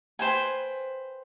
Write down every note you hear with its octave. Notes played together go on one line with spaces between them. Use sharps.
B4 C5 G5 G#5